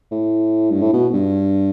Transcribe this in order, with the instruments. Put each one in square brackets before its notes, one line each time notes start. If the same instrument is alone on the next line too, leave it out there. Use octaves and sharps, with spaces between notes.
[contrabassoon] A2
G2
A2
B2
G2